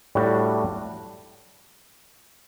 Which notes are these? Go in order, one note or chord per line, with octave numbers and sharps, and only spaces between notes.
A2 G3 D4 F#4